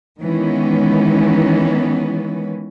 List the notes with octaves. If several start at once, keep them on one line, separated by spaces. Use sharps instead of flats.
D#3 E3 G#3 B3 C#4